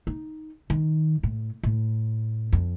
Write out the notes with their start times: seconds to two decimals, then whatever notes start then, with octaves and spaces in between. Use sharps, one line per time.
0.07 D#4
0.70 D#3
1.23 A2
1.63 A2
2.53 F2